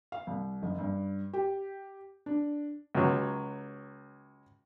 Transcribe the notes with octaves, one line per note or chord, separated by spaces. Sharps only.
F5
C2
F#1
G2
G4
D4
C#2 F#3